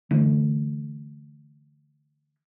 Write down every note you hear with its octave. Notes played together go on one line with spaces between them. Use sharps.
D3 E3 A3